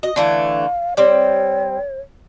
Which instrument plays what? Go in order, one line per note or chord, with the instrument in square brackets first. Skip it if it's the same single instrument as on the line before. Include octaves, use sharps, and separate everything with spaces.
[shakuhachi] F#4 [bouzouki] D#5
[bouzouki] D3 E3 A3 [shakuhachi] F5
[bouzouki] G3 C4 [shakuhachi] C#5